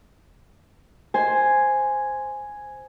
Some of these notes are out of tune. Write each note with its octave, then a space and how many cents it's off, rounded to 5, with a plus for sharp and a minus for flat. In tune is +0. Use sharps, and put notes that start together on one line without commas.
C5 +0 G#5 +0